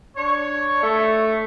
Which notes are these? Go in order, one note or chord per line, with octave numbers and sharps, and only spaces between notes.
D4 C#5
A3